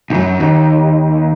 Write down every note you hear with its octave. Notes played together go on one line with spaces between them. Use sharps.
C2 F#2
D#2